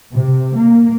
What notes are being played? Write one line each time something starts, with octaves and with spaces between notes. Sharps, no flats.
C3
A#3